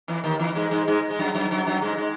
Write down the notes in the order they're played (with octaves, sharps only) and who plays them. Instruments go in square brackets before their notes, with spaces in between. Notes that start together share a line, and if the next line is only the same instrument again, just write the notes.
[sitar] E2 E3
D#2 D#3
E2 E3
G#2 G#3
G#2 G#3
G#2 G#3
G#3
F#2 F#3
F#2 F#3
F#2 F#3
F#2 F#3
G#2 G#3
G#3